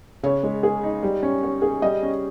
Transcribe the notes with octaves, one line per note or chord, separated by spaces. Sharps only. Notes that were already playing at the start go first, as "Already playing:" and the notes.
C#3 C#5
G#3
G#4
D#4
G3
C#4
C#5
G#4
G3 D#5
C#4